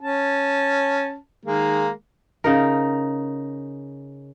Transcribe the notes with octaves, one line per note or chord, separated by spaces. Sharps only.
C#4 A5
D#3 G#3 A#3
C#3 D#4 A#4